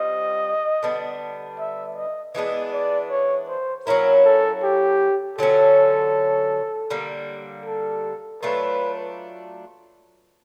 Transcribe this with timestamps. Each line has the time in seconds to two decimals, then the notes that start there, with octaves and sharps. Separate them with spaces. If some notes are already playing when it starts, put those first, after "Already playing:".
Already playing: G3 C4 F4 D#5
0.83 D3 G3 B3 D4
1.59 E5
1.96 D#5
2.35 E3 G#3 B3 D4 D#5
2.73 D5
3.10 C#5
3.48 C5
3.87 F#3 A#3 C#4 E4 A#4
4.25 A4
4.63 G4
5.39 D3 F#3 A3 C#4 A4
6.90 D3 G3 A#3
7.66 A4
8.42 F#3 A3 D4 F4 B4